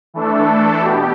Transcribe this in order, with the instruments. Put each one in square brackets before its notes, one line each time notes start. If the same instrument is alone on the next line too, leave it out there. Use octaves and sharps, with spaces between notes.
[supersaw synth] E3 A3 D4 A4
B2 B3 G4